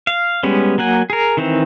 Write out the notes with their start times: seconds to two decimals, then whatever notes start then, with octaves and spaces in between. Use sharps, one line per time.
0.07 F5
0.43 G3 G#3 B3 C#4
0.78 F#3 A#3 F#5 G#5
1.10 G#4 A#4
1.37 D#3 E3 C4